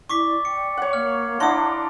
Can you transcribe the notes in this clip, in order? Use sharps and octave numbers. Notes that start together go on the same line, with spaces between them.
E4 D5 C#6 D6 B6
G5 C#7
C#5 F#5
A#3 F5 F6
E3 D4 F#5 A#5 C6 D#6
D5